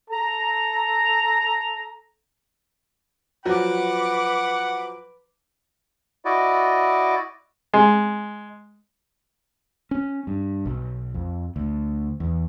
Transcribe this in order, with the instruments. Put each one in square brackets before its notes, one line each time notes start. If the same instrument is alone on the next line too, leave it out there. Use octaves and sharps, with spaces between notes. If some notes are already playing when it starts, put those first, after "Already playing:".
[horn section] A4 A#5
[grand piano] F3 F#3 F#4 [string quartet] B4 D6 [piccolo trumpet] F#5
[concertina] E4 F#4 D5 D#5
[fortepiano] G#3
[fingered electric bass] C#4
G2
B1
F2
D2
E2